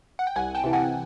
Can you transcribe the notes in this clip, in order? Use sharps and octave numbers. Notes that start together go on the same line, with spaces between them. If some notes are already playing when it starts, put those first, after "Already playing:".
F#5
G5
C2 F#5 G#5
G5 A5
C3 E3
F#5 G#5